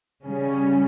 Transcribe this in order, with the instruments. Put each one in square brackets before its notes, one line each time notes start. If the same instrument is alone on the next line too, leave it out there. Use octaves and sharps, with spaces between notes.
[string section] C#3 G3 C#4